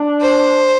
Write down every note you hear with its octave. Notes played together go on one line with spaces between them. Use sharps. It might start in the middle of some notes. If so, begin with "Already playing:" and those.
Already playing: D4
C5